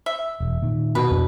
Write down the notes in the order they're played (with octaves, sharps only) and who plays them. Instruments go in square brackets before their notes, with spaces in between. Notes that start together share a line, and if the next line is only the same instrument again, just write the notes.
[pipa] E5
[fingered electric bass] E1
A#2 D#3
[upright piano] B2 [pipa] B4
[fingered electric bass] F2 D4